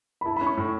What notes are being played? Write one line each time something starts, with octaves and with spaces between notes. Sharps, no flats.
B5
E4 A5
C#4 B5
C#6
A2